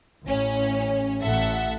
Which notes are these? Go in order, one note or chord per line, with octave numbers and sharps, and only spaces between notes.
A1 C#4
A1 A4 E5 F#5